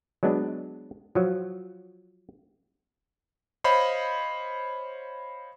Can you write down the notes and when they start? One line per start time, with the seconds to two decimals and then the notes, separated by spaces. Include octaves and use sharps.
0.23 F#3 G#3 B3 D4
1.15 F3 F#3
3.64 C5 C#5 D#5 F5 B5